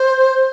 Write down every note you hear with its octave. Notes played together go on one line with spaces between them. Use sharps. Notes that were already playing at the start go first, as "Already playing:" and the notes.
Already playing: C5